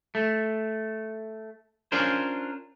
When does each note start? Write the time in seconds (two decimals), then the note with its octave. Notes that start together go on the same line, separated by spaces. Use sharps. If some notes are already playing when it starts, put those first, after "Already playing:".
0.15 A3
1.92 C#4 D4 F4 A#4 C5